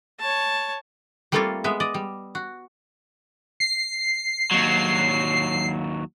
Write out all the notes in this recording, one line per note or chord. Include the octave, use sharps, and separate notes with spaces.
C#5 A5
G3 A3 A#3 C4 F4 A4
G#3 B3 E5
D5 D#5
G3
F#4
C7
D#2 F#3